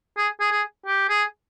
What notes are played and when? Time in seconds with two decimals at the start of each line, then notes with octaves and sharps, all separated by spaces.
0.17 G#4
0.40 G#4
0.51 G#4
0.86 G4
1.09 G#4